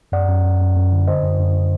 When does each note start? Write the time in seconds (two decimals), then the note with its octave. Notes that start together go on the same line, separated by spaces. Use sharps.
0.12 F#2 D5 F#5
0.28 F#2
0.44 F#2
0.60 F#2
0.76 F#2
0.92 D3
1.07 D3 C5 D#5
1.23 F#2
1.39 F#2